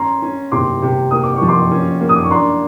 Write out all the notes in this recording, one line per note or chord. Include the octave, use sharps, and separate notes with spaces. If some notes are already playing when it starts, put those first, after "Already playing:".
Already playing: C#4 A#5 C6
C#4
C3 C6 D6
C3
A#3 D#6
D6
C#6
F3
C6 D6
C#4
A#3
D#6
D6
C#6
D4 A#5 C6